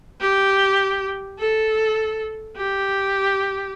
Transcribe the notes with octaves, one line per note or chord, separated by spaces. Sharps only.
G4
A4
G4